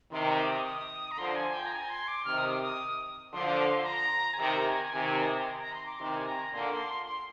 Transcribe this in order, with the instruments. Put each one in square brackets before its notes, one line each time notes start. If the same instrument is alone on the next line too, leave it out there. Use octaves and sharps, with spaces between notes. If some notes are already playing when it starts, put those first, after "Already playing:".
[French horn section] C3 D#3 [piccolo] C6
[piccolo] D6
D6
D#6
D#6
A#5
[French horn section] D3 F3 [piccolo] C6
[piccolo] G#5
G5
A#5
G#5
C6
D6
[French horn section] C3 D#3 [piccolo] F6
[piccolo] D#6
D6
D#6
[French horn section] D3 F3 [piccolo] C6
[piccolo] A#5
G#5
[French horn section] C3 D#3 [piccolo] A#5
[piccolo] G#5
[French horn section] C3 D#3
[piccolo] D#6
D6
C6
A#5
A#5
C6
D6
[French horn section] C3 D#3 [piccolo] C6
[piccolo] G#5
A#5
[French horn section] A#2 D3 [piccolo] C6
[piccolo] D6
C6
C6